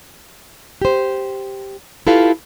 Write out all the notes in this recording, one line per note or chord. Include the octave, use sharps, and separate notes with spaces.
G4 C5
E4 F4 G4 A4 B4 F5